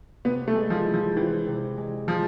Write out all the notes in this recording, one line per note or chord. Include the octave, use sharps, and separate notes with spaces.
C3 B3
A3
G#3
F3
E4
F3
E3 C4
C3
G#3
F3 G#3